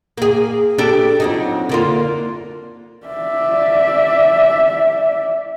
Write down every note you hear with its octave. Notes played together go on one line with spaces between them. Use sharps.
A#3 G#4
D4 G4 A4
F2 F#3 D#4
D3 A#3 F4
D5 E5